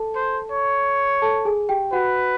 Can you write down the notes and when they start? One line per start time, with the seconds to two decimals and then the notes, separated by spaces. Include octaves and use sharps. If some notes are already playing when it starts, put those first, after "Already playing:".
Already playing: A4 A5
0.15 C5
0.51 C#5
1.22 A4 A5
1.45 G#4 G#5
1.69 G4 G5
1.93 F#4 B4 F#5